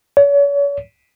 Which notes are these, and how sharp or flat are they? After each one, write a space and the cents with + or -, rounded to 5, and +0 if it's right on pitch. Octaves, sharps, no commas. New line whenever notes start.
C#5 +40